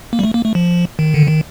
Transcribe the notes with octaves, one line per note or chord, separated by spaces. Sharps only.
A#3
G3
A3
A#3
A3
F3
D#3
D3
D#3